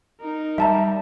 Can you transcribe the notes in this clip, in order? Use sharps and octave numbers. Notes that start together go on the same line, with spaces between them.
D#4 A#4
G3 E5 A5 A#5